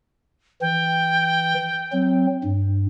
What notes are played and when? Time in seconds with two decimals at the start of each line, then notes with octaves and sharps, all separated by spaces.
0.61 E3 G5
1.92 F#3 C4
2.44 G2